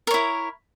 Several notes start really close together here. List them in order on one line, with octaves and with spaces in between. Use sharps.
A#4 C#5 E4